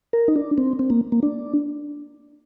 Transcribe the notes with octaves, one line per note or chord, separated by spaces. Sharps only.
A#4
D#4
D4
C4
C4
A#3
A#3
D4